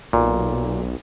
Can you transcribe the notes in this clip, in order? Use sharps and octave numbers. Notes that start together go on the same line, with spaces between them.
B1 A#2